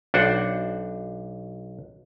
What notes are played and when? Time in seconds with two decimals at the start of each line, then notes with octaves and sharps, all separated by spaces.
0.14 B1 D4 F#4 C5 F#5